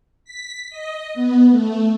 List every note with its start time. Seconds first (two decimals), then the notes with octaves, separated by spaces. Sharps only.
0.25 B6
0.70 D#5
1.14 B3
1.51 A3